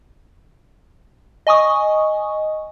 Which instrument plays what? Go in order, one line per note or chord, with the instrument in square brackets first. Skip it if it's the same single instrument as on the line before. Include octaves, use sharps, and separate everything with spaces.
[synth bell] D#5 G#5 C#6 D#6